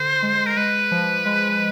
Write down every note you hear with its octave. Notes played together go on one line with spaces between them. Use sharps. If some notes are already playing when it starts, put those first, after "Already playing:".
Already playing: D3 C5
G#3
A#4
G#3 B4
F3
G#3